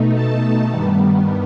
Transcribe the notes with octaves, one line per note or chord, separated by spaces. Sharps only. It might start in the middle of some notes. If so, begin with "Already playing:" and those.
Already playing: B2 A3 D#4
A5
G2 D#3 G3 B3